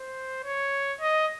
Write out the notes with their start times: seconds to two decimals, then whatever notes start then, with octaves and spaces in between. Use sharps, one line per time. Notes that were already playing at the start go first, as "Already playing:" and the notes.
Already playing: C5
0.44 C#5
1.01 D#5